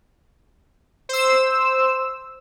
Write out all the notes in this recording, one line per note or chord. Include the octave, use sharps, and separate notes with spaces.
C5 E6